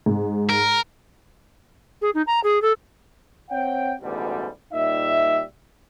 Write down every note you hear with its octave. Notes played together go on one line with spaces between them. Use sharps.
G#2
A#4
G#4
D#4
A#5
G#4
A4
C4 C#5 F#5 G5
A1 D2 G#2 B2 D3 G3
A#2 G3 D#4 E5